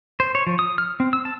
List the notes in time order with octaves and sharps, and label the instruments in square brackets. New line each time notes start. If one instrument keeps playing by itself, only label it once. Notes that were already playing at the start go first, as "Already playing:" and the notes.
[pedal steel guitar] C5
C#5
F3
D#6
F6
C4
E6
A5